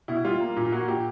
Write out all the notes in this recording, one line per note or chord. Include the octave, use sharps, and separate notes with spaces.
B2 E4
G3 F4
A#3
A#2
A#3 F#4
A#2 G4